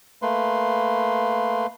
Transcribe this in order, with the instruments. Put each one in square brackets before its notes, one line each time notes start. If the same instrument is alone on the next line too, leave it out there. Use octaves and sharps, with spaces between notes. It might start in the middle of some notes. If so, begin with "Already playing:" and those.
[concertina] A3 A#3 B4 C6